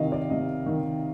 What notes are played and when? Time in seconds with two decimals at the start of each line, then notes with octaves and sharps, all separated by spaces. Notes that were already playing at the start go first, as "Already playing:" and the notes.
Already playing: C3 D#3 D#5 F5
0.12 D5
0.30 C3 D#5
0.66 D#3